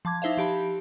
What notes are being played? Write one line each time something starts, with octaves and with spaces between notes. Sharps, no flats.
F3 A5 D6 G#6
D#4 E4 C5 E5 F5
F3 G4 A5 B5